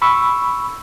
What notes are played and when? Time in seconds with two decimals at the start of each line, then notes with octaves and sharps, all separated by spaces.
0.02 B5 C#6 E6